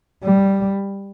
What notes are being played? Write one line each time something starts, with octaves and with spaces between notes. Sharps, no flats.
G3